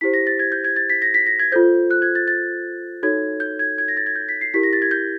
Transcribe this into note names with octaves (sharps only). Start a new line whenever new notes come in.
E4 G4 C5 B6
A#6
A6
G#6
G6
G#6
A6
B6
A#6
B6
A#6
G#6
F4 A4 C5 G6
F#6
G#6
A6
A6
D#4 F#4 A4 C#5 G#6
G6
G#6
G#6
A#6
A6
G#6
G6
B6
C7
E4 G4 A#4 B6
A#6
A6
G#6
G6